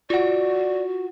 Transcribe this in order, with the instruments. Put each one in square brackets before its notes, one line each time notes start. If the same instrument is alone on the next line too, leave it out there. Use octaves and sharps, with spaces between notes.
[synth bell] F4 F#5 [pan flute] F#4 [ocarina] D5